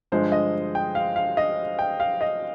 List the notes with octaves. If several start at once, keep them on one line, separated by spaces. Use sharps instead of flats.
G2 D3 F3 G#3 C5
D#5
G5
F5
F5
D#5
G5
F5
D#5